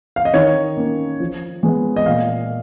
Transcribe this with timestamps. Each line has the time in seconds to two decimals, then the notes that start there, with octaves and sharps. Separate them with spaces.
0.16 F5
0.25 D#5
0.34 D#3 C#5
0.77 A#3 C#4
1.20 F3
1.63 G#3 B3
1.96 D#5
2.06 A#2 F5